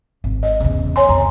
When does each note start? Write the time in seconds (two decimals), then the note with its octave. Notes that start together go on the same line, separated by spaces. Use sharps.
0.24 G#1
0.43 D#5
0.60 E2 C#3
0.96 C#5 G#5 C6
1.09 F2 A#5